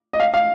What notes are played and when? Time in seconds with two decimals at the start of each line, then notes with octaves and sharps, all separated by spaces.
0.13 D#5
0.20 F5
0.34 F5